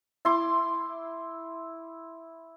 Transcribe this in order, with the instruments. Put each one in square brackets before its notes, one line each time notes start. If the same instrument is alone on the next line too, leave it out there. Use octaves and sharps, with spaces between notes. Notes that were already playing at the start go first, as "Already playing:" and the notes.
[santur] E4 C6 D6